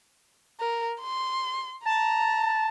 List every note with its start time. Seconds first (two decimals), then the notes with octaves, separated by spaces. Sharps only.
0.59 A#4
1.01 C6
1.85 A5 A#5